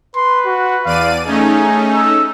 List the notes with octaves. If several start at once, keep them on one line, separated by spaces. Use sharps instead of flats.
B4 C6
F#4
E2 D5 F5 D#7
A3 C#4 D#4 G#4 G#5
E6